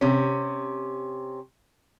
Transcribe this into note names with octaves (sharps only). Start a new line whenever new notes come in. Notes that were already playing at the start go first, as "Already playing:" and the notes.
C3 C#4